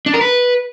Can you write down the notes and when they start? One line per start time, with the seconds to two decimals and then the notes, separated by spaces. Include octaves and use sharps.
0.06 D4
0.14 A#4
0.21 B4